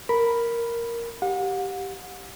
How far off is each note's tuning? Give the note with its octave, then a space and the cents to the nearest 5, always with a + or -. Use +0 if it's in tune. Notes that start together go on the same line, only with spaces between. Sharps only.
A#4 +0 B5 +0
G4 -5 F#5 -40